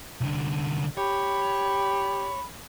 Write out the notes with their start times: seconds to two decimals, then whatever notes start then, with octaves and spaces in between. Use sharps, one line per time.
0.21 C2 D3
0.97 G4 C#5 B5